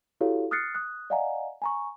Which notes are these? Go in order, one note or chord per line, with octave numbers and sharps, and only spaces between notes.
E4 F#4 G4 A4 C#5 F5
D#6 F6 F#6 A6 C7 C#7
D#6 F#6
D5 D#5 F5 F#5 G#5 A#5
G#5 A#5 C#6